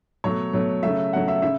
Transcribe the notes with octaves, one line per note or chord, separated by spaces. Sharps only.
B2 F#3 A3 C#5
B2 F#3 A3
C#3 F#3 A3 E5
C#3 F#3 A3 F#5
E5
C#3 E5